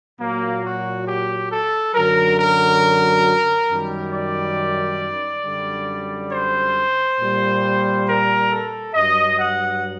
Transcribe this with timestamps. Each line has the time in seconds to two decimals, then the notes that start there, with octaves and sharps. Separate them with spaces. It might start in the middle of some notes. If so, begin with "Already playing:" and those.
0.19 A#2 F#3 A#3
0.64 F#4
1.06 G4
1.51 A4
1.94 F#2 D3 F#3 A#4
2.39 A#4
3.70 F#2 D#3 G3
4.13 D5
5.45 F#2 D3 G3
6.31 C5
7.19 A#2 G3
8.07 A#4
8.50 A4
8.94 G2 F#3 D#5
9.38 F#5